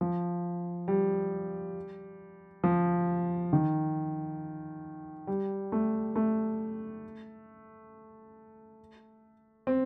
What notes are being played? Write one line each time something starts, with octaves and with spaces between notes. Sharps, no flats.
F3
G3
F3
D#3
G3
A3
A3
C4